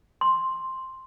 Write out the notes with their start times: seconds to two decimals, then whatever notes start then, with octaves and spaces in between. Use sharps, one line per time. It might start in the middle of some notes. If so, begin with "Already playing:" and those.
0.21 C6